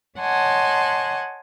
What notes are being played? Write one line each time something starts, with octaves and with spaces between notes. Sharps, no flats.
C#5 D#5 F#5 G#5 A5 C6